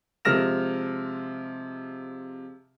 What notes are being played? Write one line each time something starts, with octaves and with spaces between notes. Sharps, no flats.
C3 F3 G#3 F6 A#6 E7